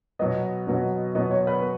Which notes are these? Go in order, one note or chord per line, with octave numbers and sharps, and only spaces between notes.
B2 F#3 B3 D#5
B2 F#3 B3
B2 F#3 B3 D#5
C#5
B4
B3